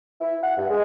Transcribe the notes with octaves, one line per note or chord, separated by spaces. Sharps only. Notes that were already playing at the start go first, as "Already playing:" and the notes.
E4
F#5
G2
G#3